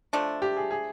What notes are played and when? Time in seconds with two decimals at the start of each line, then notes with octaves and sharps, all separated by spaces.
0.13 F3 A3 D4
0.42 G4
0.57 G#4
0.71 G#4